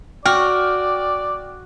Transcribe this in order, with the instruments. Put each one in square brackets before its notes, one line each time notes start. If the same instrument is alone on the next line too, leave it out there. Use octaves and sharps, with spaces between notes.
[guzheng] F#4 [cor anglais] D5 [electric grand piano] G5 F6